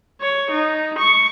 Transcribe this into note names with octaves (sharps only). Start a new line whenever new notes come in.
C#5
D#4
C#6